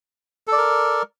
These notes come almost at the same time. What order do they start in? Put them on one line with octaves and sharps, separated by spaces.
A4 D5 A#4